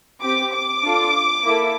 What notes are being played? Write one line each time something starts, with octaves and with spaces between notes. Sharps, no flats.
C4 G4 D6
D6
D4 F4 A4
A#3 E4 A4